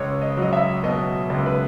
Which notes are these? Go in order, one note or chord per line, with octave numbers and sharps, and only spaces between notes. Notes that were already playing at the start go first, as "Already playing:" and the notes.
Already playing: C#2 C#5
D#5
F#3
D#5
E5
B2 D#5
C#2
B4